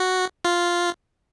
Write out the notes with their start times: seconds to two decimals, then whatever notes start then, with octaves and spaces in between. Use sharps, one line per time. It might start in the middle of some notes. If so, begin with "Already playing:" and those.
Already playing: F#4
0.45 F4